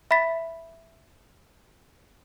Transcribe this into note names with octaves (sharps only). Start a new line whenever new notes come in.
E5 B5 A6 B6